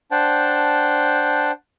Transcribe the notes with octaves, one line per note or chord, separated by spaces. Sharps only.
D4 C5 F#5 G5 A5